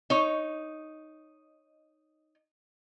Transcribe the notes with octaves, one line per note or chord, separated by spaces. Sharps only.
D#4 C#5